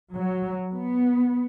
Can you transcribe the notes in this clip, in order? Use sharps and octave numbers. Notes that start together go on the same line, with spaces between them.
F#3
B3